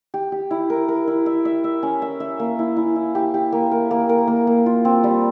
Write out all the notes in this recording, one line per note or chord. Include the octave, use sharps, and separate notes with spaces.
G4
G4
E4
A#4
A#4
E4
E5
E5
E5
C#4
E5
E5
A#3
E4
E4
E4
G4
G4
A#3
A#4
A#3
A#4
A#3
A#3
F4
C4
G3